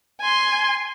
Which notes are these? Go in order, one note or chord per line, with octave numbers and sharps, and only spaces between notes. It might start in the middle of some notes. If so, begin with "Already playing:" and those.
G#5 C6